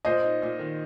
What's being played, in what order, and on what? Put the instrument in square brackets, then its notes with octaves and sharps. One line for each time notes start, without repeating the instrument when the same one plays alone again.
[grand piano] A#2 [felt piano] C5 D#5
[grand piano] D#4
A#2
D#3